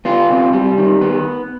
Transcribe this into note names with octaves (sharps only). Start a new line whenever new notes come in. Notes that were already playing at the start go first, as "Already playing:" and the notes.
B3 F4
C3
G3
D#3
B3